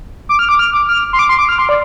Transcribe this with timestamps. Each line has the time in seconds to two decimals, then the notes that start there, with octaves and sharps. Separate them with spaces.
0.29 D6
0.39 F6
0.49 D6
0.59 F6
0.74 D6
0.89 F6
1.13 C6
1.19 D6
1.29 C6
1.38 D6
1.49 F6
1.58 C6
1.69 D5